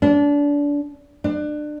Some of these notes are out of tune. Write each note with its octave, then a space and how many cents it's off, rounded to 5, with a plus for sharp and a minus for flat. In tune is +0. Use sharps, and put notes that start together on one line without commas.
D4 -25
D4 +30